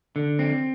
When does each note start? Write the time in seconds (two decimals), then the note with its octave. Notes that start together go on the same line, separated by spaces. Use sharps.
0.16 D3
0.39 C4